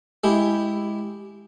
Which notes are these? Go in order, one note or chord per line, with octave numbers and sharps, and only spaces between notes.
G#3 E4 G4